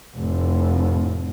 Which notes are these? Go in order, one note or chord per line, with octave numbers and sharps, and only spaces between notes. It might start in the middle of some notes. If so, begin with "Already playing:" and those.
F1 A2